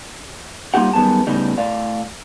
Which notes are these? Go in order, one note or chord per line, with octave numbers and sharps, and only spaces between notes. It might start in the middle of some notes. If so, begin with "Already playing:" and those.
G3 A#3 D#4 F4 G4 F#5
F#2 D#3 G3 B3 G#4 A5
A2 C#3 G3 B3 D#4
A2 D5 F5